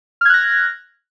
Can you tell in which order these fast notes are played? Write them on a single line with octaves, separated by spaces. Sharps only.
F6 G#6 F#6 A#6